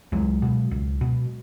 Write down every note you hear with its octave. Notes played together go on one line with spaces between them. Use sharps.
C#2 F#3 G#3
B2
C#2
B2